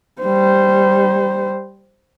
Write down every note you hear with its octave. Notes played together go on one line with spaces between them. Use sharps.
G3 C5